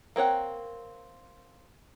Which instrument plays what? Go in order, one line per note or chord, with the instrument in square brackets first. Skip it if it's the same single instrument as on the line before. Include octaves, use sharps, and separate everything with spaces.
[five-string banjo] A#3 C4 C#5 F#5